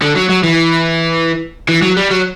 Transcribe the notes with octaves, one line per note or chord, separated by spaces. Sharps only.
D3
F#3
F#3
E3
E3
F#3
G3
F#3